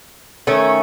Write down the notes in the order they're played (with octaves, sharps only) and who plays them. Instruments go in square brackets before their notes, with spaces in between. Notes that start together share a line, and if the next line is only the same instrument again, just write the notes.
[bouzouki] D#3 A3 C#4